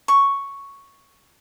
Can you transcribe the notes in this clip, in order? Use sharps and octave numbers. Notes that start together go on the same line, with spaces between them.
C#6